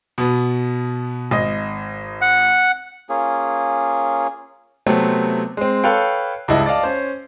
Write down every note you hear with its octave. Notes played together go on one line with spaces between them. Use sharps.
B2 B3
G#1 D#5
F#5
A#3 C#4 F4 G#4
C3 F#3 A3 B3 C4
G#3 C4
A4 B4 C#5 F5 G5
C#2 G2 E4 D#5
D5 D#5 F5 A5
C#4 C5